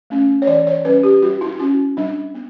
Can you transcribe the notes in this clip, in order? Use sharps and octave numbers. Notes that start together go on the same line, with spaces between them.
A3 C#4
C#5
E3 D5
C#5
G3 C#4 B4
G4
G3 F#4
E4
C#4 F#4
G3 D4
B3